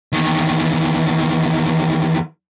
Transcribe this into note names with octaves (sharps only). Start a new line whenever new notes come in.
E2 D#3